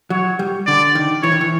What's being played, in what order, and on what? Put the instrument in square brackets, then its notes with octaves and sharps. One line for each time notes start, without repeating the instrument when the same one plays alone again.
[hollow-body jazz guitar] F#3 [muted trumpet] C#5
[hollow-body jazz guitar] G3
[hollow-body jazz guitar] D3 [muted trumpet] D5
[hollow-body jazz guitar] D#3
[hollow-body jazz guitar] E3 [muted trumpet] C#5
[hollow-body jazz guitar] D#3
E3